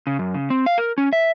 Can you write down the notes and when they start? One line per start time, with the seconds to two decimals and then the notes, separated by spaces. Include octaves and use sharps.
0.07 C#3
0.19 F#2
0.34 C#3
0.50 C4
0.66 F5
0.78 A#4
0.98 C#4
1.13 E5